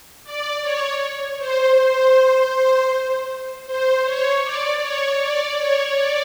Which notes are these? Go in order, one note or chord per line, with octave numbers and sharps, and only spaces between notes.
D5
C#5
C5
C5
C5
C#5
D5
C#5
D5
C#5
D5